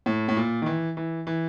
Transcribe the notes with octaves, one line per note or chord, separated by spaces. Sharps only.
A2
A2
A#2
D#3
E3
E3
E3